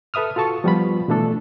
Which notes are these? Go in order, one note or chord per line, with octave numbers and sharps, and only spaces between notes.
A4 B4 E5 D#6 F6
F4 F#4 A4 A5 C#6
F3 G3 B3 F4 B5
B2 E3 A3 D4 A4